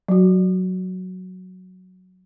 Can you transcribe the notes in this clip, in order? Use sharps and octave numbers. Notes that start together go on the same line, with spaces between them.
F#3 F#4